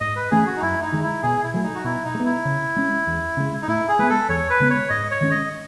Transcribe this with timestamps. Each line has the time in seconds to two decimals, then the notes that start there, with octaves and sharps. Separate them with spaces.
0.01 G#2 D#5
0.16 B4
0.31 E3 A3 C#4 G#4
0.46 F#4
0.56 D#4
0.62 F#2 E4
0.82 D#4
0.92 D#3 G#3
1.03 E4
1.23 B2 G#4
1.44 E4
1.54 F#3 A3
1.63 D#4
1.75 F#4
1.84 B2 E4
2.05 D#4
2.14 G#3
2.20 B3
2.25 E4
2.45 C#3
2.76 G#3 C#4
3.07 E2
3.37 C#3 G#3
3.62 D#4
3.68 A2 E4
3.88 G#4
3.99 G#3 B3 B4
4.09 A4
4.29 E2 C#5
4.50 B4
4.60 C#3 G#3 B3
4.70 C#5
4.90 G#2 D#5
5.11 C#5
5.21 D#3 G#3 C#4
5.31 D#5